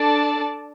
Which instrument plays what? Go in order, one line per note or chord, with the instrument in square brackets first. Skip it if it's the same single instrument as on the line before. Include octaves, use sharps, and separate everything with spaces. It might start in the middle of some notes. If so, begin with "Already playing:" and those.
Already playing: [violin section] D4 A4 D5 A5